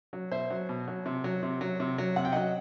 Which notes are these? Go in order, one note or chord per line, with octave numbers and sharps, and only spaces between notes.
F#3
B2 C5 E5
F#3
B2
F#3
C3
F#3
C3
F#3
C3
F#3
C3 F#5
G5
F#3 D#5 F#5